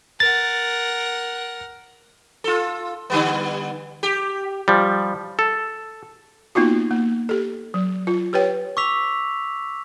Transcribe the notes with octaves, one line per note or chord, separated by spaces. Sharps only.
A#4 F#5 A6
F4 A4
D3 G3 B3
G4
F3 G3
A4
A#3 B3 D#4 F4 F#4
A#3
G4 A4
F#3
F4
G4 B4 C#5 G5
C#6 D6 E6 B6 F7